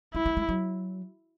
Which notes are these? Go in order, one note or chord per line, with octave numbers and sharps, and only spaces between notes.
G#3 E4
A3
G#3
F#3